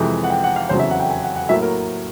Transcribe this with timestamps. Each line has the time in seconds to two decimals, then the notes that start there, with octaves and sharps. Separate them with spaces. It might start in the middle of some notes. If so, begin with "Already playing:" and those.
Already playing: F2 C3 E3 G#3
0.23 F#5
0.30 G5
0.44 F#5
0.56 F5
0.69 F1 E2 C#3 F#3 C5
0.79 E5
0.90 F#5
1.00 G5
1.10 G#5
1.23 F#5
1.36 F#5
1.49 A2 F#3 A#3 E5
1.62 A#4